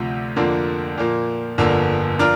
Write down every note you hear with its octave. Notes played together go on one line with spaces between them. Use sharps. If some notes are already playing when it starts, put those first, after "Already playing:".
Already playing: D2 C3 F3
F2 D3 F3 A#3 D4
A#2 F3 A#3
G1 F2 D3 A#3
F3 D4 F4 A#4